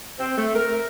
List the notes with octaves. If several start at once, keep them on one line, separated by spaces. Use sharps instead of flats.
C4
A3
A#4